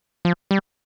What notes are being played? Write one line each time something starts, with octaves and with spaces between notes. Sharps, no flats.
F3
G3